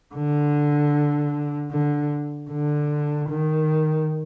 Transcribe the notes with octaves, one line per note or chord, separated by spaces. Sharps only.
D3
D3
D3
D#3